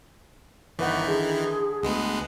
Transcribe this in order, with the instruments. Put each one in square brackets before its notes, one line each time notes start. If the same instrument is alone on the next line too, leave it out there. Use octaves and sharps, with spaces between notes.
[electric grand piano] G1 B4 F#5 [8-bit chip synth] D#3 E3
[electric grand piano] D3 [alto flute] G#4
[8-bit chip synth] D2 G#3 B3